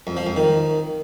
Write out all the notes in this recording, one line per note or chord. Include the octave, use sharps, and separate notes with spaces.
F2
F3
F2
D#3